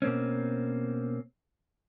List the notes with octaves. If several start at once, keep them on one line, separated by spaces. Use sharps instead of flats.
B2 A#3 C4 C#4